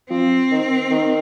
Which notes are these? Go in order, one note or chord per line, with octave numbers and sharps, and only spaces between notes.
F3 C4
D#3
D#3